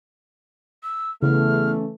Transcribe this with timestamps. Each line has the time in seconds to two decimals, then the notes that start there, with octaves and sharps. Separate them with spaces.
0.83 E6
1.22 E2 C#3 E3 A3 F6